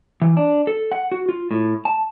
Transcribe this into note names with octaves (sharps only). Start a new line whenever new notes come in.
E3
D4
A4
F#5
F#4
F4
A2
A5